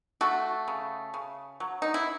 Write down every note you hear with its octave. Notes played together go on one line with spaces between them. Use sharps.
A3 F#4 A4
C#3
C#3
F#3
D#4
E4